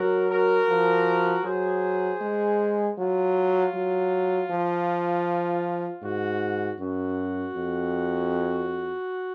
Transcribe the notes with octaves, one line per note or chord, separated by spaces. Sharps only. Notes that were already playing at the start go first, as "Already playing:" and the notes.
Already playing: F#3 F#4 A#4
F#4 A#4
F3
F#3 G#4 C5
G#3
F#3 F4
F#3
F3
G#2 F#4
F#2 F#4
F2